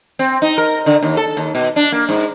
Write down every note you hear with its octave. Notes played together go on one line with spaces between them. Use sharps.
C4
D#4
A#4
D3
D#2
A4
D#2
B2
D4
A#3
G#2